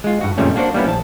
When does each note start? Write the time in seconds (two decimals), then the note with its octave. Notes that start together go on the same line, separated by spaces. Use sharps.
0.04 G#3 F4
0.21 G2 F#4
0.38 F2 A#2 C#3 G3 A3 C#4
0.56 A#3 D4 F#4 C5 D5
0.74 G3 A#3 B3 C#4 E4
0.87 A#1 A5